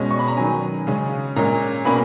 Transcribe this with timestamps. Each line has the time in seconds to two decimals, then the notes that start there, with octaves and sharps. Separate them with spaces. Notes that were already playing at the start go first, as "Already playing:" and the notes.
Already playing: B2 G#3 C#4
0.11 C#6
0.19 B5
0.28 A#5
0.37 D#3 F#3 C#4 G#5
0.87 C#3 G#3 C#4
1.36 A#2 G#3 C#4 A#5
1.85 B2 A#3 C#4 B5